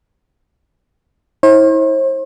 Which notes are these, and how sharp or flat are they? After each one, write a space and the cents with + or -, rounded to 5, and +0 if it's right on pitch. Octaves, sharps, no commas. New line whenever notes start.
E4 -35 C5 +45